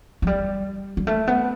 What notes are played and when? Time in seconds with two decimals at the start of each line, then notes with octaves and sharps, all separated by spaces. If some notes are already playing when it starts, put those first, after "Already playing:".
0.22 F#3
0.27 G3
0.97 G3
1.07 A3
1.27 B3